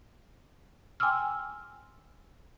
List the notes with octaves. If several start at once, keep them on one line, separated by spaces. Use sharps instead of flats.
G5 G#5 C6 D6 E6 F6